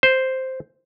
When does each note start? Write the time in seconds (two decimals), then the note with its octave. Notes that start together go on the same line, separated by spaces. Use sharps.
0.03 C5